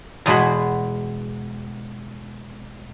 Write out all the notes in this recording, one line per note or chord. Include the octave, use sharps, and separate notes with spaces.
E2 B2 G#3 F#4 B5